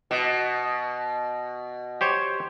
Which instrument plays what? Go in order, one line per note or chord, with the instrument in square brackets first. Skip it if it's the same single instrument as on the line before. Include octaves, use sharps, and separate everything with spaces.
[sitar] B2
[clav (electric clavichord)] G4 C5 C#5